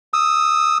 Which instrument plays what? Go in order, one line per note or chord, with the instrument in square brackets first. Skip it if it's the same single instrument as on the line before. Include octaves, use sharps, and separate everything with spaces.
[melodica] D#6 E6